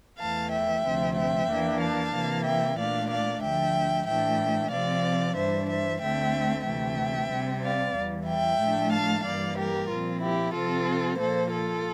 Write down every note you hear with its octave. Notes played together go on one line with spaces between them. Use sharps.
E2 E3 A3 F5 A5
E5 G5
D2 C3 F3 C4
E5 G5
E2 E3 A#3 D4
F5 A5
C3 E3 A#3
E5 G5
A#2 A3 D4 D5 F5
D5 F5
D2 D3 F3 E5 G5
A2 E3 A3 D4 E5 G5
C3 F3 C4 D5 F5
G2 E3 G3 D4 C5 E5
C5 E5
D2 D3 A3 C4 E5 G5
D2 C3 E3 A3 E5 G5
C3 G3 C4
D5 F5
E2 E3 G3
E5 G5
A2 F3 A3 D4
F5 A5
G2 E3 G3 A#3 D5 F5
G4 A#4
A#2 F3 C4 F4
E4 G4
C3 F3 C4 F4 A4
A#2 F3 A#3 A4 C5
F4 A4